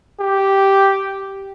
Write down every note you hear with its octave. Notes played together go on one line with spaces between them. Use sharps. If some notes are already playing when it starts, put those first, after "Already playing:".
G4